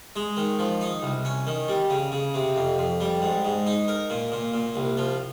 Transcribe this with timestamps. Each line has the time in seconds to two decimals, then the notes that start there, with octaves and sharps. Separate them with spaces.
0.16 G#3
0.37 D#3
0.59 F3
0.81 D#4
1.03 C2
1.25 C#4
1.47 D#3
1.68 G3
1.90 C#3
2.12 C#3
2.34 C3
2.56 F2
2.78 F2
3.00 G3
3.22 G#2
3.45 G#2
3.66 D#4
3.88 A#4
4.10 A#2
4.32 A#2
4.54 A#2
4.76 C2
4.97 F3